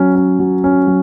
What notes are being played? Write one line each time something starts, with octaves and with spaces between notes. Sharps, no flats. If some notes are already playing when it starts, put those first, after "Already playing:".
Already playing: F#3 C#4
C#4
F#3
C#4
F#3